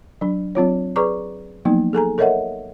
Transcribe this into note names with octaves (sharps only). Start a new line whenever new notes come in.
F#3 D4
F#3 C4 F4 C#5
G#4 B4 D5 A#5 C#6 D6
F3 F#3 A#3 B3 D#4
G#4 A4 G#5 A#5
A4 A#4 C#5 D#5 E5 F#5